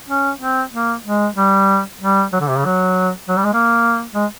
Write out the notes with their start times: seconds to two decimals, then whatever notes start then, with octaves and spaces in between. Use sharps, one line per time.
0.09 C#4
0.40 C4
0.72 A#3
1.05 G#3
1.36 G3
2.01 G3
2.33 F#3
2.40 D3
2.49 C3
2.57 C#3
2.65 F#3
3.29 F#3
3.37 G3
3.44 G#3
3.53 A#3
4.14 G#3